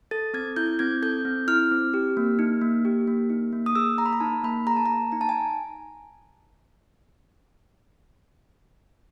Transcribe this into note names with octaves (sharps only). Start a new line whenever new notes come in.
A4 A6
C4 G#6
E4 G6
C4 G#6
A4 G6
C4
E4 F6
C4
G4
A#3
D#4
A#3
G4
A#3
D#4
A#3
D#6
G#4 E6
A#3 A#5
B5
A#5
D#4 A5
A#3 B5
G#4 A#5
A5
A#3 A#5
D#4 A#5
A5
G#5